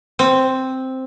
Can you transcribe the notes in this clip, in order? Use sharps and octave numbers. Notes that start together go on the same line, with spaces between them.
C4